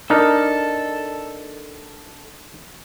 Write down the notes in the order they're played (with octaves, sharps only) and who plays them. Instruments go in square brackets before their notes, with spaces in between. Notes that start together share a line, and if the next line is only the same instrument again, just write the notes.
[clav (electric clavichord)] D4 D#4 A#4 [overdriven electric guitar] A4